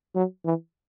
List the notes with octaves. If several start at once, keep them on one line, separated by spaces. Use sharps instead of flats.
F#3
E3